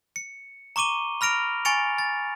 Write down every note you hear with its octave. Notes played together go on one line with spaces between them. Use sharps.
C#7
A#5 C#6 D6 D#7 G7
B5 F6 A#6 D7 F7
G#5 C#6 A6 C#7 D7 F7
A6